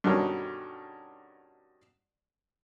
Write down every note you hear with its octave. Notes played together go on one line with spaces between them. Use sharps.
G2 B2 D3 D#3 C#4